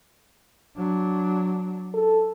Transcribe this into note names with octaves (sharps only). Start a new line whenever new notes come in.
F#3 D4
A4